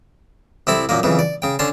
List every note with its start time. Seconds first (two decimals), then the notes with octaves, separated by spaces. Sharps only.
0.67 C2 C4 E4 A4
0.89 F#2 A#2 A#3
1.03 F2 C#3 E3
1.19 D5
1.42 C#3 G5
1.59 D3 C#4 A5 C6